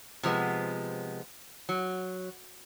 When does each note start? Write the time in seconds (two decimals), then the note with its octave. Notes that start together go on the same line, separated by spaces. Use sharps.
0.23 C3 F3 G#3 B3
1.69 F#3